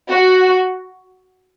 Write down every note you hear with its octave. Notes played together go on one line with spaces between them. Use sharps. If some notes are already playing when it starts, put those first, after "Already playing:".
F#4